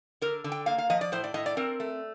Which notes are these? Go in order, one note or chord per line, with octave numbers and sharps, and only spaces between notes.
D3 A#4
D3
G5
A#3 F5
F5
F3 D#5
D5
A2 C5
D5
A2 D#5
D5
C4 A#4
A3